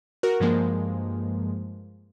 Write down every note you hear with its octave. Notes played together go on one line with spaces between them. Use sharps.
F#4 A#4
G2 F3 G#3 A#3